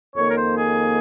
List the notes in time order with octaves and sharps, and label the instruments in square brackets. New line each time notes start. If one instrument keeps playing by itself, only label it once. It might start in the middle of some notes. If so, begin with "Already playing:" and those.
[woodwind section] F2 D#3 A#3 C#5
A#4
C5
G#4